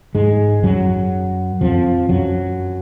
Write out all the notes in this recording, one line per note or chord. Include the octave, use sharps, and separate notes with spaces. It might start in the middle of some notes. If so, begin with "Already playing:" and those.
G#2 G#3
F#2 F#3
F2 F3
F#2 F#3